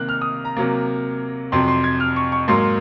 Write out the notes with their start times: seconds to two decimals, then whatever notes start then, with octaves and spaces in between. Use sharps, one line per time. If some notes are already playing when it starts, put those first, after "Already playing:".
Already playing: C3 D#3 A#3 F#6
0.09 F6
0.21 D#6
0.45 A#5
0.57 C3 F#3 A#3
1.52 F2 C3 F#3 C6
1.68 C6
1.84 G#6
2.00 F6
2.16 C#6
2.32 C#6
2.48 G#2 F#3 A#3 C6